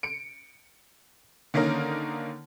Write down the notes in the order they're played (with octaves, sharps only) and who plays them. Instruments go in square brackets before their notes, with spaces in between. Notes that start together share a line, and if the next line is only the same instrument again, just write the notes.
[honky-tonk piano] C#7 D7
D3 D#3 A#3 C#4 D#4 A#4